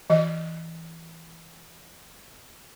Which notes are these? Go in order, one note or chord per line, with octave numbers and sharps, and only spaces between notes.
E3 D#5